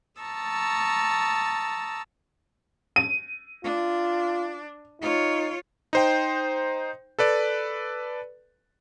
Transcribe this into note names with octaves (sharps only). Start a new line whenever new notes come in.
A5 A#5 C#6 D#6 E6 A6
D#7
D4 F4
D#4 F4 C#5
D#4 C5 G5
A4 B4 D5